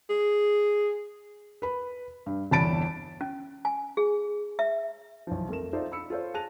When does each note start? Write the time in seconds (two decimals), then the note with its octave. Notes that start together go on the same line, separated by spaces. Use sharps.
0.09 G#4
1.62 B4 B5
2.26 G2
2.51 G1 E2 A5 B5 A6 D7
3.21 C#4
3.65 G#5
3.97 G#4
4.59 E5
5.27 B1 E3 F3
5.49 F2 A3 A#4 E7
5.73 D#4 F4 A4 C5 D5 E5
5.92 B5 E6 C#7
6.10 F4 A4 C5 C#5
6.34 G#4 A5 F#6 A#6 D#7 F7